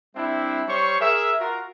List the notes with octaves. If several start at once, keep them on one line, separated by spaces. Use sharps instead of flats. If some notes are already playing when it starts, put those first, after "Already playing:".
G3 C4 D4 E4 E5
G3 C5 C#5 C#6
G#4 A#4 E5
F4 F#4 A#4